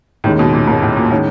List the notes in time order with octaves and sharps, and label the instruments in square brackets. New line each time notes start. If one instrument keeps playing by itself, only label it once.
[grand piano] D#2 D#3 G#3 C#4 [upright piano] A2
[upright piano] B2
A#2
[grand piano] D#2 D#3 G#3 C#4 [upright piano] G#2
[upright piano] A2
A#2
[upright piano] A2 [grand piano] D#3 G#3 C#4